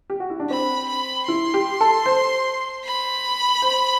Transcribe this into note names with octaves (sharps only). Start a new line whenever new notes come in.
G4
F#4
E4
D4
C4 B5
B5
E4 C6
G4
A4
C5
B5
C5